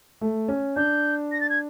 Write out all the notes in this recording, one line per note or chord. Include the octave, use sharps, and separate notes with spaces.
A3
C#4
D4 G6
A#6
A6
G#6